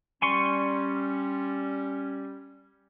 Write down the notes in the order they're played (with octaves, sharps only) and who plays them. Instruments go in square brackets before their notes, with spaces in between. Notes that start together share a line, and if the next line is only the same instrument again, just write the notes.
[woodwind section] G3 C#4 [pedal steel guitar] G#5 C6 C#6